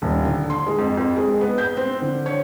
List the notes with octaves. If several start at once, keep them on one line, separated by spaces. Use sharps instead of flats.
D#1
D3
C6
G#3
F2
F2
G#3
B3
G6
C4
D3
C#5